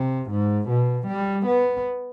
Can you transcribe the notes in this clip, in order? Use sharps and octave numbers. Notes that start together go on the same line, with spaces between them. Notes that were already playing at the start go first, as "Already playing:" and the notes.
Already playing: C3
G#2
B2
G3
B3